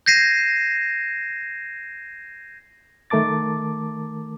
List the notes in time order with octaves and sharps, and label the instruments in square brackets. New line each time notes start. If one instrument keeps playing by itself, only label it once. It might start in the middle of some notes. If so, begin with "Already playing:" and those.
[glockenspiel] G6 G#6 A#6 C7 D#7 E7
[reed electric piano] D#3 A3 A#4 A5 D6 A6